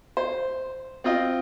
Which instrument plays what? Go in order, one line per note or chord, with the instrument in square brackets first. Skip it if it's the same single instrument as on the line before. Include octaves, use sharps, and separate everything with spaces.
[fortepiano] C5
C4 F4 D#5